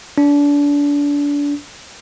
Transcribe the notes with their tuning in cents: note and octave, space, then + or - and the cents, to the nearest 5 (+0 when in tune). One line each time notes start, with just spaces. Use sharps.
D4 -30